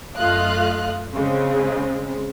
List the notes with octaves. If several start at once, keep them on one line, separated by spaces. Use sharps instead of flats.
F#2 A3 F4 D#5 F5 F#6
C#3 G#3 C4